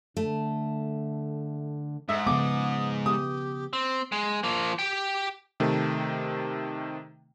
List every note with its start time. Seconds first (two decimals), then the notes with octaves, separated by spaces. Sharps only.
0.17 D3 A3
2.09 G#2 E5 D#6
2.27 C#3 F3 B3 D6
3.06 B3 G4 D#6
3.73 C4
4.12 G#3
4.43 F3 A#3
4.79 G4 G5
5.60 C3 D#3 A3